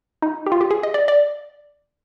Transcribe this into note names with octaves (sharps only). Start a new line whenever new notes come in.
D#4
G4
F4
G4
G#4
D#5
D5
D5